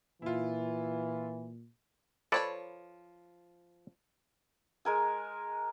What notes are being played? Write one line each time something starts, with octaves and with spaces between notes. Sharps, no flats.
A#2 E3 E4 F4
F3 A4 B4 C#5 D5 B5
G#3 A#4 G#5